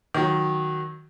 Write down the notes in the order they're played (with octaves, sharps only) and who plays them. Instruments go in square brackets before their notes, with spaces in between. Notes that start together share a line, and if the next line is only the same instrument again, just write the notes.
[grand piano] D#3 F#3